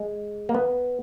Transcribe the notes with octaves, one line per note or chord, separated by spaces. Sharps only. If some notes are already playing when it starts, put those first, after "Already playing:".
Already playing: G#3
A#3
B3